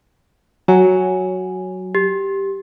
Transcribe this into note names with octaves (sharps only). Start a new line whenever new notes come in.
F#3 G#5
G4